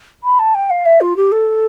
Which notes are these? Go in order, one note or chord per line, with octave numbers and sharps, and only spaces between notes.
B5
A5
G5
F5
E5
F4
G4
A4